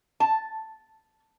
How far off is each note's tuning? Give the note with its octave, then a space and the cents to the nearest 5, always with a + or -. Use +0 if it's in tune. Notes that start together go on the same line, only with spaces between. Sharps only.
A5 -5